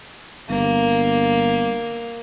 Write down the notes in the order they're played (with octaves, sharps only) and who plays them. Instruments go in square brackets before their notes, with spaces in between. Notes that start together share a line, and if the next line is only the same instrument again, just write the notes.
[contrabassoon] G1 [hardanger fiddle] A#3